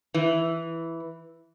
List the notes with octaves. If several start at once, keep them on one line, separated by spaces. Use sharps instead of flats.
E3